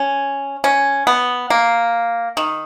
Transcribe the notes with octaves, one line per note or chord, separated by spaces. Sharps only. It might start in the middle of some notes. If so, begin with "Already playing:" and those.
Already playing: C#4
C#4
B3
A#3
D#3